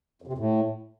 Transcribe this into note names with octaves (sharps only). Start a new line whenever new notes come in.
F2
C3
F2
A2